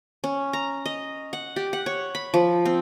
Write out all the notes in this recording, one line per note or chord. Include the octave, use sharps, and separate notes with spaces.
C#4
A#5
D#5
F#5
G4
F#5
C#5
B5
F3
C4